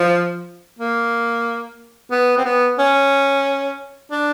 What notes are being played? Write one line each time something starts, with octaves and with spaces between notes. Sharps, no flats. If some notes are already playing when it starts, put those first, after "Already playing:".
Already playing: F3
A#3
B3
C4
B3
C#4
D4